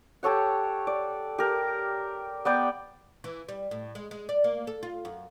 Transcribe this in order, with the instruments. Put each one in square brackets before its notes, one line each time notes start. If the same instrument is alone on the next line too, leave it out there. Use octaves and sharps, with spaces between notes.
[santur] G4 A4 C#5 F#5
D5
G4 A#4
B3 D5 G5
[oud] E3
G3
A2
G#3
G#3
D5
A#3
A4
F4
F#2